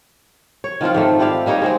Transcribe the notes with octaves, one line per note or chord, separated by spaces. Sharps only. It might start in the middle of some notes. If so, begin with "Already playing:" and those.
C#5
D#3 F3 C4 F4
G#2 D#3 A3
E4 G4 D5 F5
G3 A#3 D#4 C#5
G#3 C4 G#4